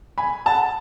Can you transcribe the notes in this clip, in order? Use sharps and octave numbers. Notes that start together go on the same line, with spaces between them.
G#5 B5
F#5 A5